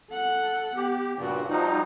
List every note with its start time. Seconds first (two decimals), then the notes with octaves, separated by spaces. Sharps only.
0.10 A4 F#5
0.76 B3 G4
1.18 G2 A#2 C#3 D4 F#4
1.49 F3 G3 D#4 F4 F#4